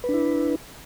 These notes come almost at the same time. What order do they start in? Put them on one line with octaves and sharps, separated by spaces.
B4 D4 E4